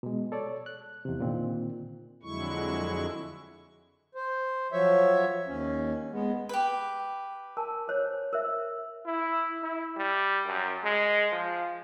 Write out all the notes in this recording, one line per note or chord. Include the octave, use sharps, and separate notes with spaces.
B2 G#3
A4 C#5 D5
F#6
E2 C3
A#2 D3 D#3 C4
F2 D3 F#3 G#3 E4 C#6
C5
F3 F#3 C#5 E5
D#2 C#4
G#3 B3
G4 B4
A#4 G#5 A5
A4 C5 C#5
A#4 C5 E5
E4
E4
G3
F#2
G#3
F3